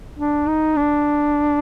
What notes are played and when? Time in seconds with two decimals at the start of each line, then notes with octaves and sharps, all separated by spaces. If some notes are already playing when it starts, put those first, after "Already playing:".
0.19 D4
0.48 D#4
0.77 D4